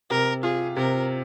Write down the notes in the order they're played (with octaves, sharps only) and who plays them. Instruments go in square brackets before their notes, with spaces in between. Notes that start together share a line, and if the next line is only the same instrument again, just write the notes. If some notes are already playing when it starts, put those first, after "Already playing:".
[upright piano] C3 [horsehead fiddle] A#4
[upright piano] F4 [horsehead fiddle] G#4
[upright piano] C3 [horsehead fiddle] A#4